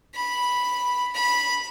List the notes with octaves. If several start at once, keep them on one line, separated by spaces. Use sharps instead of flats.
B5
B5